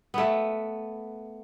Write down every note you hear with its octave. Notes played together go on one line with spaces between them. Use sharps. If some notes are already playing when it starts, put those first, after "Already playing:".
A3 B3